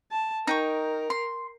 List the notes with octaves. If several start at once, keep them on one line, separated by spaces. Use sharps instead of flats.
A5
D#4 A#4 G5 C#6
C6